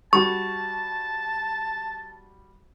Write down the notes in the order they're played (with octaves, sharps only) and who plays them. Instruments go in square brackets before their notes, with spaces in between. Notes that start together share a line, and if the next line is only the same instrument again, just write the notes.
[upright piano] G3 F#4 [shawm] A5 [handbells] C#6